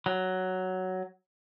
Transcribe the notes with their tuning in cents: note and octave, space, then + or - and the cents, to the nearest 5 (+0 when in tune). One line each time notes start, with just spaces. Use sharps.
F#3 +5